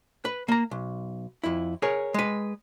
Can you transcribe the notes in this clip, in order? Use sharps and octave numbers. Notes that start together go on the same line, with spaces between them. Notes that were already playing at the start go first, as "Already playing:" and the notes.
B4
A#3 A#5
B1
F2 E4
G#4 A#4 C#5
G#3 B4